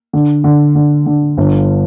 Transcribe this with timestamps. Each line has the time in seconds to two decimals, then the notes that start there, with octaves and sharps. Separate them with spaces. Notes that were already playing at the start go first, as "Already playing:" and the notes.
0.13 D3
0.44 D3
0.75 D3
1.06 D3
1.37 G1